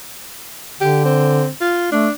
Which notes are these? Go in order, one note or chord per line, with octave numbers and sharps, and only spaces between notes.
D3 G4
C4
F4
A3 D4